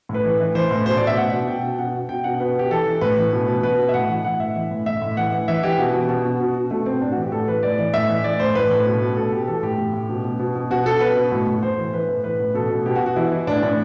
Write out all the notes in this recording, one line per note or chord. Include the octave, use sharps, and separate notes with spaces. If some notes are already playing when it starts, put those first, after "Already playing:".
A2
B4
E3
E3
E3 C5
A2
B2 C5
D5
B2
E5
B2 F#5
B2
B2 G5
B2
B2 F#5
B2
B2 G5
B2 F#5
B2 B4
B2 G4
E3 A4
E3
A2 B4
E3
B2
B2
B2 B4
B2
E5
A2 F#5
E3
E3 F#5
A2 E5
E3
A2
A2 E5
A2
E3 F#5
E3
E3 E5
E3 G4
B2 F#4
B2
B2 F#4
B2
B2
B2
B2 A3
B2 C4
A2 D4
F#4
E3
G4
A2 A4
E3 B4
A2 D5
E3 D5
A2 E5
E3
E3 D5
A2 C5
A2 B4
A2
B2
B2
B2 A4
B2 G4
E3 A4
A2 G4
A2
A2
B2
B2
B2
B2
B2 F#4
B2 A4
B2 B4
B2
A2
A2
A2 C5
E3
E3 B4
A2
E3 B4
A2
B2 A4
B2
B2 G4
F#4
B2
F#4
E3 E4
E3
A2 D4
A2 D4